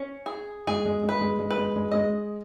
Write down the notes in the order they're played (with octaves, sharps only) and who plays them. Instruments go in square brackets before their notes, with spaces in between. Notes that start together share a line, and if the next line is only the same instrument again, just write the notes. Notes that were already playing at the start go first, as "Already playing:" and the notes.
Already playing: [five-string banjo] C#4
G#4
[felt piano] G#3 [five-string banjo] G#4
[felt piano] G#3
G#3
[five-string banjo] B4
[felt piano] G#3
G#3
[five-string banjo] B4
[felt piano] G#3
G#3
[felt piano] G#3 [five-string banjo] D#5